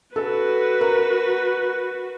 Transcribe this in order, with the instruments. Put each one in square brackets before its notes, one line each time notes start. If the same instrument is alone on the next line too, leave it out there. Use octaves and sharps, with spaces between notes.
[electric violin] F#4 B4 [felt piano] A4
[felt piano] A#4